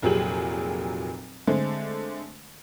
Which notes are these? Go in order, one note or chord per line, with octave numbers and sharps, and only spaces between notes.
F1 A#2 F#3 G4 G#4 F#7
D3 G#3 A3 C4